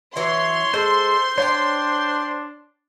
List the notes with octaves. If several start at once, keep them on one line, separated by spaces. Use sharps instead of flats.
E3 F#3 E4 C#5 C6
G#3 A4 C5
D4 C5 C#5 F5 G5